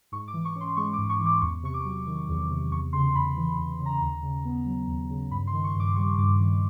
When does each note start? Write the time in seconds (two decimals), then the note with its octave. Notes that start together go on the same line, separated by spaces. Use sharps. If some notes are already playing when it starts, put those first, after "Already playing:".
0.12 G#2 C#6
0.28 D6
0.34 E3
0.45 C#6
0.56 C#4 C6
0.77 G#3 C#6
0.93 D6
0.98 G#2
1.10 C#6
1.20 E3
1.26 D6
1.42 E2 C#6
1.63 C3 C#6
1.74 D6
1.85 F#3
2.07 D#3
2.29 E2
2.51 C3
2.71 E2 C#6
2.93 C#3 C6
3.15 E2 B5
3.37 E3
3.58 E2
3.80 C#3
3.86 A#5
4.01 D#2
4.23 C#3
4.45 B3
4.66 F#3
4.88 D#2
5.10 C#3
5.31 G2 B5
5.47 C6
5.53 D#3
5.64 C#6
5.75 G2 D6
5.96 G3 C#6
6.18 G2 D6
6.39 D#3